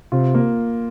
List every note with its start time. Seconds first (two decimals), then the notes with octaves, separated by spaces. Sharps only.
0.12 C3 F4
0.35 A#3